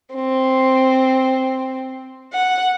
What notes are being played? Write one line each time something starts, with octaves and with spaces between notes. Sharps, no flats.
C4
F#5